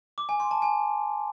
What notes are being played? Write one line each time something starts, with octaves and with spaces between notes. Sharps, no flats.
D6
G#5
C6
A5
G#5